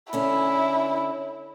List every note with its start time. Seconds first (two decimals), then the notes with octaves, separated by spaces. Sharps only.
0.13 D3 C#4 E4 A4